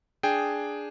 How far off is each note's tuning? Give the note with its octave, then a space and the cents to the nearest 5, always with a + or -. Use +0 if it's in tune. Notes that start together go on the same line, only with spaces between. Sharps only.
D4 +0 G#4 +0 G5 +0